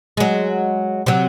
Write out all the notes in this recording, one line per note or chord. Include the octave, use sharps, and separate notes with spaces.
F#3 G#3
C3 F#3